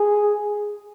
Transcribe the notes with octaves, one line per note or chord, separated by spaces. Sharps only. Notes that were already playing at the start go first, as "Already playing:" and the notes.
Already playing: G#4